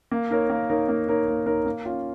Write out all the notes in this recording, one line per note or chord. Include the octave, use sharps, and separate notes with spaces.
A#3
D#4 A#4 C#5
A#3
D#4 A#4 C#5
A#3
D#4 A#4 C#5
A#3
D#4 A#4 C#5
A#3
C#4 F4